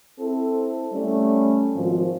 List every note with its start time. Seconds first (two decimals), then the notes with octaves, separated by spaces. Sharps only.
0.19 C4 E4 A4
0.93 G3 A3 C#4
1.75 G#1 F3